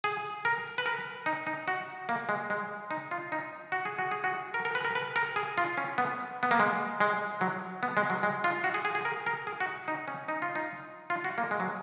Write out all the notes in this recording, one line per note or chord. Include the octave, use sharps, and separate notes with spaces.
G#4
A#4
B4
A#4
D#4
D#4
F#4
A#3
G#3
G#3
D#4
F4
D#4
F#4
G#4
F#4
G#4
F#4
A#4
A#4
B4
A#4
B4
A#4
G#4
F4
C#4
B3
B3
A#3
G#3
G#3
F#3
B3
G#3
F#3
G#3
F4
F#4
G#4
G#4
G#4
A#4
A#4
G#4
F#4
D#4
C#4
D#4
F4
D#4
F4
F#4
A#3
G#3
F#3